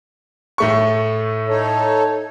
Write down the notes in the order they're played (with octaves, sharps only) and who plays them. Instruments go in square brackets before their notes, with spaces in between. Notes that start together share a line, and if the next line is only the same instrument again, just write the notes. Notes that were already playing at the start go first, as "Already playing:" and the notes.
[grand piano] A2 A3 C#6
[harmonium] D#4 A4 C#5